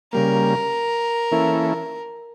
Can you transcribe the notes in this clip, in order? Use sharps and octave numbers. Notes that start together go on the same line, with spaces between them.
C#3 G3 A#3 A#4
E3 A#3 C#4 E4 A4